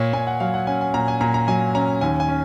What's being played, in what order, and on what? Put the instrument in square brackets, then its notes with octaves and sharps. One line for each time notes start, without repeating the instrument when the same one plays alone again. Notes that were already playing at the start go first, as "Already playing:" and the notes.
Already playing: [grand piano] A#2 C#5
A#2 G#5
F#5
F#3 F5
F#5
C#4 G#5
G#5
A#2 A#5
G#5
A#2 A#5
A#5
F#3 G#5
C#4 A#5
D#2 G#5
G#5
C#4